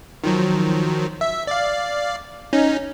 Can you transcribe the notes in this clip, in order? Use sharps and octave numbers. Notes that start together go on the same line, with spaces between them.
D#3 F3 F#3
E5
D5 F5
C#4 D#4